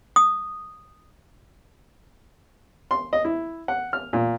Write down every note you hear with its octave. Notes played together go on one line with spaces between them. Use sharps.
D#6
C6
D#5
E4
F#5
F6
A#2